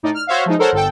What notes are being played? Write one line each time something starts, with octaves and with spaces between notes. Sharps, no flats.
A2 D#4 D5
F6
F#4 C5 C#5 E5 F5
F3 G#3 D#4
A4 A#4 C5 C#5 F#5
G1 A4 G5